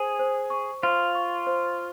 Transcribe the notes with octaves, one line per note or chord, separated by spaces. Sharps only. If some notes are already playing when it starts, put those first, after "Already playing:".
Already playing: G#4 C5
C5
C#6
F4 C5
C#6
C5